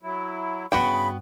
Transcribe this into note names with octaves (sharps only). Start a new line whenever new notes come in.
F#3 E4
G2 C#3 B3 E4 F#4 G5 B5